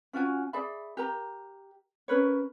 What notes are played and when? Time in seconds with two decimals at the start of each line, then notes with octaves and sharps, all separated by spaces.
0.13 C#4 F4 F#4 G#5
0.53 G#4 D5 E5 B5
0.97 G4 A#4 A#5
2.08 C#4 A#4 B4 C#5